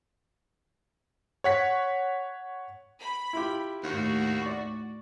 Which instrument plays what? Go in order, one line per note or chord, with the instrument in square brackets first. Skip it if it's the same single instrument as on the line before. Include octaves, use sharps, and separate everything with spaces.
[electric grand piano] C#5 F#5 B6
[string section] B5
[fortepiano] E4 F4 G4
[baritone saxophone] D#2 [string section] A2 F#4
[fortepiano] D5 C#6